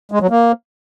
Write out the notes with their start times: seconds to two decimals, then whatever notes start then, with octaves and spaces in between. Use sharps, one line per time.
0.12 G#3
0.21 F#3
0.30 A#3